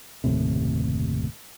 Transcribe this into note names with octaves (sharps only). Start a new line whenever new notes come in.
F#1 D#2 A2 C3